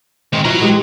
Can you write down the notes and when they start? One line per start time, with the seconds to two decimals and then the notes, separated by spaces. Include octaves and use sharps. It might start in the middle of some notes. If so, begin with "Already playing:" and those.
0.33 D#3 G#3 C4
0.45 F3 E4 F#4 A#5
0.60 E3 G#3 G4